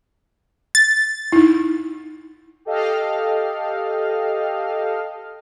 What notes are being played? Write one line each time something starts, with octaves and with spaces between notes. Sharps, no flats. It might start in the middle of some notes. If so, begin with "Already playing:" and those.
A6
D#4 E4
G4 A4 D#5 F5 G5 F6